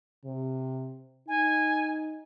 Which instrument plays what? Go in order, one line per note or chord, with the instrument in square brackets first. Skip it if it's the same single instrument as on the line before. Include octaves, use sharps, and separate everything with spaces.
[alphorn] C3
[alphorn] D#4 [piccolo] G#5